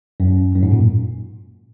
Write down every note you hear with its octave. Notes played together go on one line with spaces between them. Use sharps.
F#2
F#2
G#2
A#2